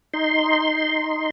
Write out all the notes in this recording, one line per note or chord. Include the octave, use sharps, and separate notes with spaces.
D#4 C6